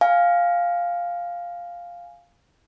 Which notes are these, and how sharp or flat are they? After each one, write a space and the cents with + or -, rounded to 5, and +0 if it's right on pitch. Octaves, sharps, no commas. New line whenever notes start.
F5 +0 G#5 +0